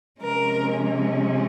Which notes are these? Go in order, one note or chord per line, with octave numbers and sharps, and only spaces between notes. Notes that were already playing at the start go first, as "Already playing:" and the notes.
C3 F3 G#3 C#4 A#4